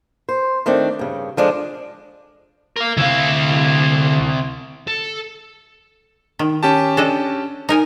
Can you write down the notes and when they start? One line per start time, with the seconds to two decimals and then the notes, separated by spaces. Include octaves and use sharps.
0.29 C5
0.66 D#3 A3 C4 D4
0.99 G2 C#3
1.37 F3 G#3 D4 A4
2.76 A#4 F5
2.97 D2 C3 E4 F5
4.88 A4
6.39 D#3
6.63 C#4 G4 A5
6.97 D4 A4 D#5
7.69 D#4 A#4 G#5